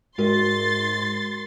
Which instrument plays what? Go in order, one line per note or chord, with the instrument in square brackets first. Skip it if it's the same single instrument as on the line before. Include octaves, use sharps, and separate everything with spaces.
[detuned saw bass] G#2 [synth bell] G#3 F#4 A#4 [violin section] C6 A6